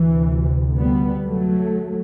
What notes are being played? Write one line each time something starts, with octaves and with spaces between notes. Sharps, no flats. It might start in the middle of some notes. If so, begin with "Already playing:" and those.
Already playing: D2 C3 E3
G3 B3
F#3 A3